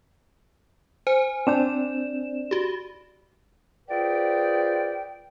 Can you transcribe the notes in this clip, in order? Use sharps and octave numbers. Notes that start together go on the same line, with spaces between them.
C5 G#5
C4 D4 D5 E7
F#4 G4
F4 G#4 B4 C5 D5 G5